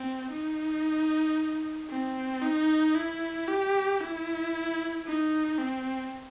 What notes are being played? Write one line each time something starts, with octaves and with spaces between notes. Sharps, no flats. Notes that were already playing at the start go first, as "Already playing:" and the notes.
Already playing: C4
D#4
C4
D#4
E4
G4
E4
D#4
C4